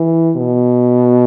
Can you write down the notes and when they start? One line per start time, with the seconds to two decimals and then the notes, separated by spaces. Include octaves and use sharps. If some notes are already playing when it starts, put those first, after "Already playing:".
Already playing: E3
0.36 B2